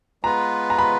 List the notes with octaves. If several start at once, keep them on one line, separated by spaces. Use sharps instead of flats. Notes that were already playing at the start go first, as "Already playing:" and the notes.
G#3 B3 F4 B4 A#5
A#5
B5